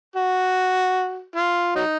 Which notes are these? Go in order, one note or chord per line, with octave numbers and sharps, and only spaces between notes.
F#4
F4
F#3 D#4